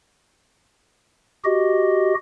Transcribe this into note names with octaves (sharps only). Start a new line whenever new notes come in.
F#4 G4 D#5